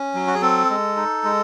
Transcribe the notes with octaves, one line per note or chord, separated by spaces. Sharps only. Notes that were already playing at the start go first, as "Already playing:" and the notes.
Already playing: C#4
F#3
F#4
G#4
C4 A4
G#3
D#4
G#3